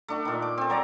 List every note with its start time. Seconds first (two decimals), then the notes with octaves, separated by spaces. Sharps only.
0.08 A3 D4 F#4
0.25 A#2 D#3
0.42 D6
0.58 C4 A4
0.70 F#3 D5 A#5